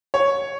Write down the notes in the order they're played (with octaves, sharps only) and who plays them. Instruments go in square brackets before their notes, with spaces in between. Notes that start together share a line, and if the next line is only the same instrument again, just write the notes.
[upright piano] C#5